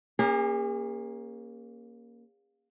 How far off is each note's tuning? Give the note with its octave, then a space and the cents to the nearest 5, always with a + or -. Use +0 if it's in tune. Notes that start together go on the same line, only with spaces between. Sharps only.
A#3 +15 C#4 +0 G#4 -40